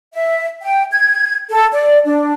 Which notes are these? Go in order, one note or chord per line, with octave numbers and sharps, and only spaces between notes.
E5
G5
G#6
A4
D5
D4